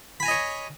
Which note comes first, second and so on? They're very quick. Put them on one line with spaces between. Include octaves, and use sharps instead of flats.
B5 G#5 A#5 D#5 C#5